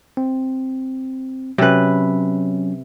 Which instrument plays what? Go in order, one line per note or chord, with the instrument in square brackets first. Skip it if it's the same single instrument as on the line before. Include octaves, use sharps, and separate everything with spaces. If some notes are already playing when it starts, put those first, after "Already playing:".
[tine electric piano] C4
[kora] C3 B4 [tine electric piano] F#3 C#4